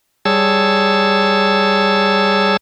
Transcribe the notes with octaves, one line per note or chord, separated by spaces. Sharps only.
G3 G#4 C#5 A5 E6